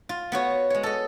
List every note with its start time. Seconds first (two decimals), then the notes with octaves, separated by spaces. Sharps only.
0.09 F4
0.32 B3 F#4 C#5
0.70 G#3 C#5
0.83 A4 D#5